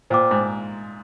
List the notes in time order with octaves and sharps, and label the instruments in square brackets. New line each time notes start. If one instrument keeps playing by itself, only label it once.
[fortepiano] A#2 [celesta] C5 G5 D6
[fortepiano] G#2